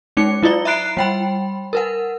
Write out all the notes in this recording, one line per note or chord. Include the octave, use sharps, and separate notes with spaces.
G#3 C#4 D#4 D6 C#7
F#3 E4 F4 D5 G7
E5 A#5 B5 F#6 C7 D7
G3 G5 B5
A#4 B4 F#5